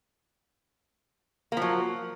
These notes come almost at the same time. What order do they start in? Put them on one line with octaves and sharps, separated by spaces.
A#3 F3 F#3